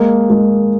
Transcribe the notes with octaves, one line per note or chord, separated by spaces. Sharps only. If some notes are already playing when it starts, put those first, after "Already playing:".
Already playing: G#3 A#3
G#3 A#3